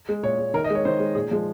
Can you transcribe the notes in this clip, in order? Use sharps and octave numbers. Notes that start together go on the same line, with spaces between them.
G#3
A#2 C#5
G#3
D#3 A#4
D#5
G#3
C#5
D#3 C5
G#3
A#2 G#4
F3 G#3